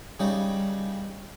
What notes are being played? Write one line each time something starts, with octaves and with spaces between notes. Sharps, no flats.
C#3 G3 D#4